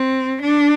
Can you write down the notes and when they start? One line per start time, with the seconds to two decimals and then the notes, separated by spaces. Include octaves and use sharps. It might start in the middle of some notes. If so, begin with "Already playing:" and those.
Already playing: C4
0.42 D4